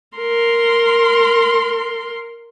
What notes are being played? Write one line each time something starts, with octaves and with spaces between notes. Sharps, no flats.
A#4 C6